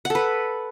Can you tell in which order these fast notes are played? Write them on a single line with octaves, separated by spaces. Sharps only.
F#5 A4 B4